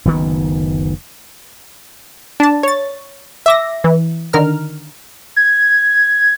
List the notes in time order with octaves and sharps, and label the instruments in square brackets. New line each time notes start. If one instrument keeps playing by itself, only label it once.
[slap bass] F#1 D2 D#3 B3
[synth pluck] D4 A5
C#5 A6
E5 D6 A#6
E3
D3 D#3 A#4 F6
[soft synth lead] G#6